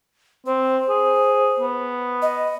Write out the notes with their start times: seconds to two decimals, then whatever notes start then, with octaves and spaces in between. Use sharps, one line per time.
0.46 C4 C5
0.89 G#4
1.60 B3
2.22 D#5